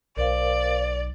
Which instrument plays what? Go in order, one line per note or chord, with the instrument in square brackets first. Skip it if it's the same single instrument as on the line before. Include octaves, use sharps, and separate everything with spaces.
[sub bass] B1 [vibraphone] A#4 C5 F5 [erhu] D5